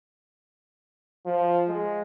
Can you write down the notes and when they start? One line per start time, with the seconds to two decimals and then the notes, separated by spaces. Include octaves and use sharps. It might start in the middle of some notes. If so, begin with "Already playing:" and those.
1.26 F3
1.68 G#3